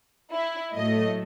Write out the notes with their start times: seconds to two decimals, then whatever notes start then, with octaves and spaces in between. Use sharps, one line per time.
0.34 E4
0.74 A2 F#3 A3 D#5